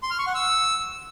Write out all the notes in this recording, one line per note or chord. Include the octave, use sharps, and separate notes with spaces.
C6
F6
C#6
F#5
E6